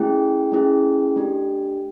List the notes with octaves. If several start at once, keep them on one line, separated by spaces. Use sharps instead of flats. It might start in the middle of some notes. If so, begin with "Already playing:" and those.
Already playing: A3 C#4 E4 G#4 G5
A3 C#4 E4 G#4
A3 D4 G4